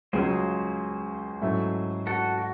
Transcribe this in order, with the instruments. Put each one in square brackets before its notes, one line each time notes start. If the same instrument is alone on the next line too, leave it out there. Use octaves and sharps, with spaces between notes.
[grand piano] C#2 C#3 F#3 [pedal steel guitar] G#4 C5
[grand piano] G#2 F#3 A3 C#4 E4
[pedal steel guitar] F#4 A4
F#4